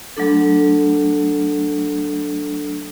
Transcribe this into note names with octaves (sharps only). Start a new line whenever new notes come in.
F#3 A3 D4 A4